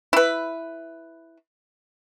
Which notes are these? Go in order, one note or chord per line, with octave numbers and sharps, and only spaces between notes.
E4 B4